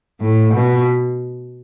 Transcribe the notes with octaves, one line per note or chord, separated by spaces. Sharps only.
A2
B2